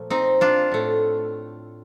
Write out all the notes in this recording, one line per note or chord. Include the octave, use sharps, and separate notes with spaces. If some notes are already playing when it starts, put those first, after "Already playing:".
Already playing: A#2 F3 A3
C4 D#4
D4 F4
A2 A3